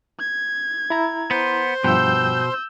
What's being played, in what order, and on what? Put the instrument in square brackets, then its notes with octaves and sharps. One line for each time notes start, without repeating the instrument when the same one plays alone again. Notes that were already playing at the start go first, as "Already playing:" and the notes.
[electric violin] G#6
[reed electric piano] E4 A#5
[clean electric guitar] B3 [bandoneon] C5 C6
[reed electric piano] G2 F3 G5 [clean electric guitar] B2 [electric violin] E6 G6